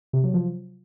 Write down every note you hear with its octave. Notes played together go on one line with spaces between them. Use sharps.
C3
F#3
F3